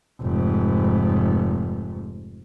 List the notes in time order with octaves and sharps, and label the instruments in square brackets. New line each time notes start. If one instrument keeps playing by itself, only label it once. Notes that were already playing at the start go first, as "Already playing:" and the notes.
[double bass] F1 G#2